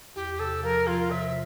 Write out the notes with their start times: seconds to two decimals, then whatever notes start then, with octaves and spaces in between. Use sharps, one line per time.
0.16 E2 G4
0.39 C3 A4
0.63 F3 A#4
0.87 F3 F4
1.11 C3 E5